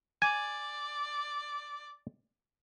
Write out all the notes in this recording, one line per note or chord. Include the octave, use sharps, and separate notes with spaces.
D5 G#5